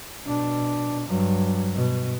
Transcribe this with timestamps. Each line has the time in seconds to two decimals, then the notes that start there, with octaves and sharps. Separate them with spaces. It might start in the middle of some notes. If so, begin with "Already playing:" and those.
0.25 B2 D4
1.07 G2 F#3
1.74 B2